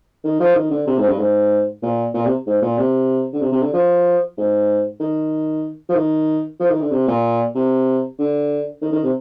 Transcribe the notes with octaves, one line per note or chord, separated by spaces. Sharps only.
D#3
F3
D#3
D3
C3
G#2
G2
G#2
A#2
A#2
C3
G#2
A#2
C3
D3
C3
C3
D3
F3
G#2
D#3
F3
D#3
F3
D#3
D3
C3
A#2
C3
D3
D#3
D#3
C3